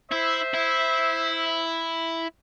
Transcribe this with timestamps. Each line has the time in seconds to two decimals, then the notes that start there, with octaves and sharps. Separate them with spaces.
0.12 E4 C5 E5
0.54 E4